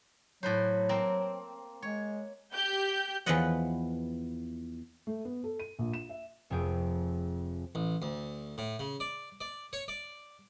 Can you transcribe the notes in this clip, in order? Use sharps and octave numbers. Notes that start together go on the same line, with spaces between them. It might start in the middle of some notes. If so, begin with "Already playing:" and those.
A2 F#3 B4 C5
A#3 C4
G#3 C#5
G4 G6
E2 F3 B3 B4 D#5 F#5
A3
B3
A4
D#7
A#1
E7
E5
F1 F2 G#4 G5
A1
D2
A2
C#3
D5
D5
C#5
D5